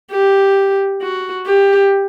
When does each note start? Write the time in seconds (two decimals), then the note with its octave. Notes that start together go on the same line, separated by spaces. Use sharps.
0.11 G4
1.02 F#4
1.47 G4